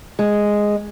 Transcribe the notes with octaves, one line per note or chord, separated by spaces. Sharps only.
G#3